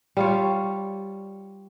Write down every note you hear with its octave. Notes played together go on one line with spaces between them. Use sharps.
G3 F4 C#5